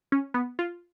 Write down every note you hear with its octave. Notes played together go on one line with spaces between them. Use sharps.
C#4
B3
F4